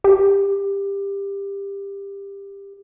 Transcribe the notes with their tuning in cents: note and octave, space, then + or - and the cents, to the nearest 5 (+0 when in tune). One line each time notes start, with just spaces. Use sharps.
G4 +20